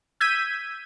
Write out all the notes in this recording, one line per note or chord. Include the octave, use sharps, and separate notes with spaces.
E6 G6 G#6 B6 D#7